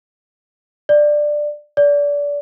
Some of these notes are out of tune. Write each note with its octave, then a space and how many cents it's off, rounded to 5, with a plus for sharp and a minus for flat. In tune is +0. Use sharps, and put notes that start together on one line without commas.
D5 +10
D5 -25